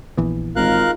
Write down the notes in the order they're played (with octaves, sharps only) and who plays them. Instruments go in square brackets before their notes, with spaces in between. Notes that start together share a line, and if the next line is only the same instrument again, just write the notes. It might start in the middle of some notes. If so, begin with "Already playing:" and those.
[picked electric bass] A#1 E3 B3
[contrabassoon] G#1 [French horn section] G#3 D#4 F4 [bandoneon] A#4 F5 F#6